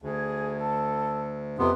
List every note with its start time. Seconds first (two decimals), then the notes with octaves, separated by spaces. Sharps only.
0.02 D2 G#4
0.58 A4
1.58 F2 C3 B3 C6